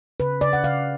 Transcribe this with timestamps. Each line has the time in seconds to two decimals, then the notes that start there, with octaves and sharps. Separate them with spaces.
0.20 C#3 B4
0.41 C#3 D5
0.53 F#5
0.63 C#3 F5